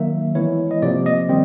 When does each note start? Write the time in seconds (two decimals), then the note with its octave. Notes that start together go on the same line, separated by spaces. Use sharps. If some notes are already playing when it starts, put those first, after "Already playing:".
Already playing: D#3 F#3 A#3 E5
0.35 E3 G#3 B3 E4 C#5
0.71 D#5
0.82 C3 F3 A#3 D5
1.06 D#5
1.29 D#3 G3 C4